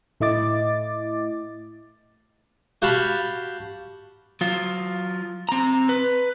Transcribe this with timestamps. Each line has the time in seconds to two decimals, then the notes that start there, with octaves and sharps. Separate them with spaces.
0.20 A2 A3 E4 D#5 D6 A6
2.82 F#4 G4 F5 A5 B5
4.41 F#3 F4
5.49 C4 A#5
5.89 B4